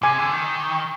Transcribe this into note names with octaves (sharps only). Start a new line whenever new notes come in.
C3 G#5
D3
D#3